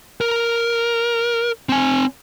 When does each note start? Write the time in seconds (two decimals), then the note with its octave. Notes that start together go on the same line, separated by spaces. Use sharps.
0.21 A#4
1.69 C4 G#5